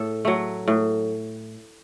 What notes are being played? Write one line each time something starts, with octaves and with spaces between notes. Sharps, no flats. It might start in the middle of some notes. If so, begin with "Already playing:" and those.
Already playing: A2 A4
F#3 A3
A2